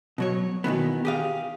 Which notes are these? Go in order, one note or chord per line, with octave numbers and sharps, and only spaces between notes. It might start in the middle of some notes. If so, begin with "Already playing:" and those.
B2 F#3 C#5
B2 D#3 E3 B3
G4 G#4 F5